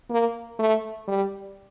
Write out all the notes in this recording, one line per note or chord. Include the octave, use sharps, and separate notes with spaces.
A#3
A3
G3